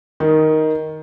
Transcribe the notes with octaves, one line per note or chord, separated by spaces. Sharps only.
D#3